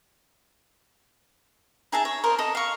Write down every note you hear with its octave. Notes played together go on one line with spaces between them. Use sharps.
D#4 G#4 E5 A5
C#5
A#4 C5 D#5
A4 D#5
F5 C#6